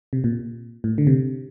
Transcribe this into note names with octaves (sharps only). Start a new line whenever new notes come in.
C3
A#2
A2
D3
C3